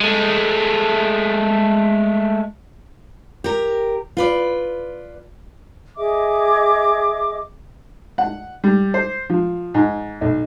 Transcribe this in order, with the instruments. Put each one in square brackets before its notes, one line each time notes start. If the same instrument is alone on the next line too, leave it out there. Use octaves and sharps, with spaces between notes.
[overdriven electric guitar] G#3 A3
[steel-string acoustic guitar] G4 A#4
F4 B4 D5
[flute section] G#4 D#5 E5 D6
[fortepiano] F#5
G3
C5
F3
G#2
B1